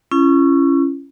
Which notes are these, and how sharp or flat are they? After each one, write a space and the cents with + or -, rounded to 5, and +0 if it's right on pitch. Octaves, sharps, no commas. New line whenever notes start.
C#4 -5 E4 +40